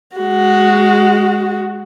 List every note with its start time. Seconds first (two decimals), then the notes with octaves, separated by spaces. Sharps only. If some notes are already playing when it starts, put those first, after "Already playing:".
0.16 G#3 F#4